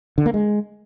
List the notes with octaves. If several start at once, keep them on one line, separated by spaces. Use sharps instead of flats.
D3
A#3
G#3